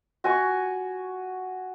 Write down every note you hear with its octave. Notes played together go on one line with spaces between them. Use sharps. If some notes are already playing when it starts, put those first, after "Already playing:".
F#4 G#5 C#6